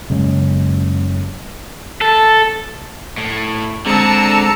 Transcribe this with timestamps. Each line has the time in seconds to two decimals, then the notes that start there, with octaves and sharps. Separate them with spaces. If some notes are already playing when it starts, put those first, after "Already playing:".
0.10 F#1 C#3 G#3
2.01 A4
3.17 A2
3.86 D3 G#3 C4 D4 A5 A#5 E6 C#7